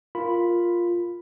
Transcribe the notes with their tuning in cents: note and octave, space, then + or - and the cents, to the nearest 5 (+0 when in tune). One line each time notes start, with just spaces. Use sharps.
F4 +0 A#4 +0 B5 +0